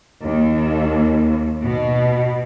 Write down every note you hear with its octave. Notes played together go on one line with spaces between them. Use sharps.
D#2
B2